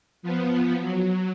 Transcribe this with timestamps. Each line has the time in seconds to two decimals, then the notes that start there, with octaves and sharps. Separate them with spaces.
0.23 F3 B3
0.79 F#3